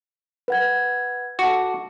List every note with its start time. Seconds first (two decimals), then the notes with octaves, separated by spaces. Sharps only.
0.48 B4 F#5 G#6
1.39 F#4 A4 D6